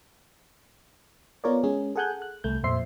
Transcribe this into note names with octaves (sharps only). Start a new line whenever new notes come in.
B3 F4 A#4 C#5 D5
G#3 C#4 G#4
G#4 A4 F#5 G#5 F#6 G6
F#6
C2 A3 G6
F2 A#2 C5 E5 C6 C7